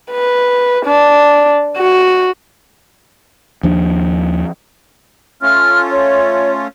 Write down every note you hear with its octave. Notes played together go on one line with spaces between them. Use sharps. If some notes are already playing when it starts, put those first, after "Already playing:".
B4
D4
F#4
D#2 F3 D4
A3 C#4 F4 F6
C#5